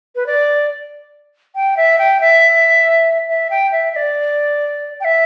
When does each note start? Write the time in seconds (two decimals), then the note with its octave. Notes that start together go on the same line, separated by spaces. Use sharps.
0.16 B4
0.26 D5
1.56 G5
1.77 E5
1.99 G5
2.21 E5
3.28 E5
3.50 G5
3.72 E5
3.93 E5
3.96 D5
5.01 G5
5.05 E5